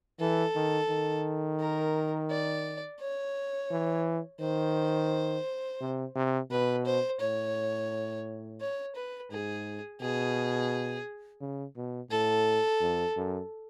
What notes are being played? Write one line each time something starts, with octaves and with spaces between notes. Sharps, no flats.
E3 A4
D#3
D#3
A#4
D5
C#5
E3
D#3 C5
C3
C3
B2 B4
C5
A2 C#5
C#5
B4
G#2 G#4
B2 G#4
C#3
B2
A2 A4
F2
F#2